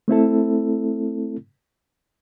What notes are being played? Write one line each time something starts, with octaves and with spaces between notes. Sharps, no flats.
A3 C4 E4 A4